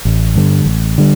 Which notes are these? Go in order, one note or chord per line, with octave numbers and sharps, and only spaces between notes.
A1
G2 D3 G3
A1
D3 G3